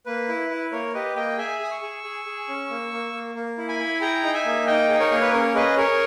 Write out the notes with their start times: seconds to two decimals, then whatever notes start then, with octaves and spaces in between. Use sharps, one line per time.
0.06 A#3 B4
0.28 E4
0.50 E4
0.72 A#3 A#4 C#5
0.93 G4 B4 D#5
1.15 A#3 D#5 G5
1.38 G#4 E5 G#5
1.60 G#4 D#6
1.70 C#6 E6
1.82 G#4
2.04 G#4
2.25 G#4
2.48 C#4
2.70 A#3
2.92 A#3
3.13 A#3
3.35 A#3
3.58 E4
3.68 G#5 B5
3.79 E4
4.01 G#4 G5 A#5
4.23 D#4
4.34 E5 G#5
4.45 A#3
4.67 D#4 D#5 G5
4.89 G#4
5.00 A#4 C#5
5.11 A#3
5.21 B4
5.33 C#4 A#4 C#5
5.55 G#4 B4 D#5
5.77 G#4 A#4 C#5